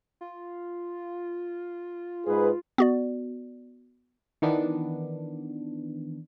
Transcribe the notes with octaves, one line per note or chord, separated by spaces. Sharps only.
F4
G#2 F4 G#4 B4
B3 F#4 D5
D#3 E3 B3 D4